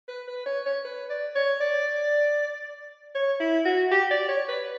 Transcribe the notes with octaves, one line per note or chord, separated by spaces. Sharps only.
B4
B4
C#5
C#5
B4
D5
C#5
D5
C#5
E4
F#4
G4
D5
C#5
B4